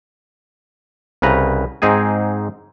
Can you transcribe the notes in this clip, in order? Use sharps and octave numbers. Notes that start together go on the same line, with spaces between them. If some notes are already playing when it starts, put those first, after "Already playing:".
C2 C#3 B4 A#5
G#2 C4 D#4 G#4 G#5